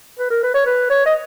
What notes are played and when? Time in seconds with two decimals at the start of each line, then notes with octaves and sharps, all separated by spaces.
0.19 B4
0.30 A#4
0.43 B4
0.54 C#5
0.66 B4
0.90 C#5
1.06 D#5